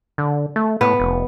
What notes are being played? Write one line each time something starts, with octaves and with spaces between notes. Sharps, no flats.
D3
A3
A2 B3
F1